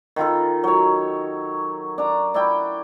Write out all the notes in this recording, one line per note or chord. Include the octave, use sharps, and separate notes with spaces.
D#3 F4 A4
F#3 C#5
D4 A#5
D4 E4 G5